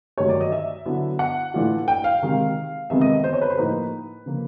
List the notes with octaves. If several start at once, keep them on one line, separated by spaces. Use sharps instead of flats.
G2 D#3 F#3 A3 C#5
D5
D#5
E5
D3 F#3 B3 E4
F#5
A2 E3 A3 D4 F4
G5
F5
C3 D#3 G#3
F2 C3 D#3 G#3 B3 E5
D#5
C5
C#5
B4
C5
A2 F3 A#3 D#4 B4
C#3 F3 A#3